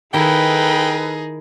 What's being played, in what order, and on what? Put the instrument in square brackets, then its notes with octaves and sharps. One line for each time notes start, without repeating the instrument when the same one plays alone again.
[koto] D#3 E4 [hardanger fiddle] D#4 G#4 [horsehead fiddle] A4 B4 [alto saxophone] G5